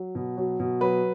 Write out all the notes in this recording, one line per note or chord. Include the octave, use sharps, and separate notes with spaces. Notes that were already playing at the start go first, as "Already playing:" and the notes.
Already playing: F#3
B2
F#3
B2
F#3 B4